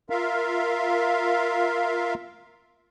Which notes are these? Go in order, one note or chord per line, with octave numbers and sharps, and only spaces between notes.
F4 A#4 E5 F5